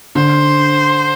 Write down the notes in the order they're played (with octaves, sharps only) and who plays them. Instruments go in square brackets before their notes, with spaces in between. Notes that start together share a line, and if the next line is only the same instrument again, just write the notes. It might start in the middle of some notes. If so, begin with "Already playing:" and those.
[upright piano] D3 [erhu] C5